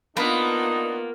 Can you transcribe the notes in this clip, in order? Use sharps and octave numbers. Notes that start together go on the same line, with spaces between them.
A#3 B3 D4 D#4 F4 B4